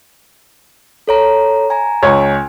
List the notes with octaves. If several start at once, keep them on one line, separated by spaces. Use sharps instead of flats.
A4 C#5 A#5
G#5 A#5
C#2 C#5 G#5